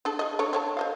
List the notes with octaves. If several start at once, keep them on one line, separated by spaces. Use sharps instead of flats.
D4 G#4 A4
G#4 D#5
D4 A4 C#5
C4 C#5 A5
C5 D#5 F5